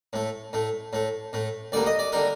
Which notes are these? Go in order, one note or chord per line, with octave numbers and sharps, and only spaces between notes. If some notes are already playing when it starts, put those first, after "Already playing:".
A2 A3
A2 A3
A2 A3
A2 A3
D2 D3 G3 A#3 D5
D#5
D5
D3 G3 A#3 A#4